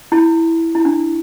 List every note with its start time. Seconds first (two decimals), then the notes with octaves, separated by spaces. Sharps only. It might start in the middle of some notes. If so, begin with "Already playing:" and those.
0.12 E4
0.75 E4
0.85 D4